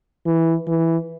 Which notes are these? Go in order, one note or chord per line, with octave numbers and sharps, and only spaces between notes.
E3
E3